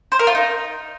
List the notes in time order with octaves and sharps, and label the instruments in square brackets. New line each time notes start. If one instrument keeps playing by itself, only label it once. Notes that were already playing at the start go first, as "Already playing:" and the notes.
[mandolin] C5
A#4
F4
D#4